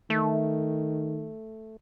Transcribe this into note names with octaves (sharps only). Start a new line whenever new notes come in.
D#3 A3